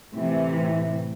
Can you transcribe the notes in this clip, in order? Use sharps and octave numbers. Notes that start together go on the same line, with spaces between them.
A2 C3 E3 A3